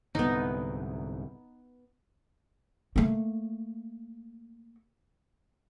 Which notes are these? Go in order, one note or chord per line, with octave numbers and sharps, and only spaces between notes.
C2 G#2 D3 B3 D#4
A3 A#3